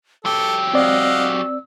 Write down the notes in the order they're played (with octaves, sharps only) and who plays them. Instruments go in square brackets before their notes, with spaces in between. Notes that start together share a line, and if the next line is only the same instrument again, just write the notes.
[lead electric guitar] F#3 G4 [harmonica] A4 [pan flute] E6
[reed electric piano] C4 D5 [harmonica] D#5 F5 F#5